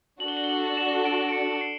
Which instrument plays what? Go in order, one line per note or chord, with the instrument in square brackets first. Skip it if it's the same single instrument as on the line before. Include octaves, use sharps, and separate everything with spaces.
[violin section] D4 F#4 A4 [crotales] F#7
[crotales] G7
F#7
G7
F#7
E7
D7
D7
C#7
C7